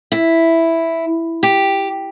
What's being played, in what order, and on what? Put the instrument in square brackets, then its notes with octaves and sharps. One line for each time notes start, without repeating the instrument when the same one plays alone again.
[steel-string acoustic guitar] E4
G4